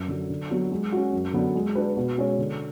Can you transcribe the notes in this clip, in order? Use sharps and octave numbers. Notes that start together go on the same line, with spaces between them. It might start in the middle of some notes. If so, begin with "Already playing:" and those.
Already playing: F#2
D3 F#3
D3
F#3 B3 F#4
G#3
C#4 F#4
F#2
D3 F#3 B3 D4
G#3
D4 F#4 B4
B2
G#3 C#4 G#4 C#5
D3